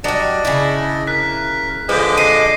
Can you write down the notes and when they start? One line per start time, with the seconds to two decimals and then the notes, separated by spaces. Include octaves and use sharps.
0.04 F#3 G3 D4 D5 D#5
0.45 C#3 E4
1.07 A#4 F#6 B6
1.89 D3 F3 G#3 B4 D6
2.17 D#5 A#6 C7 D#7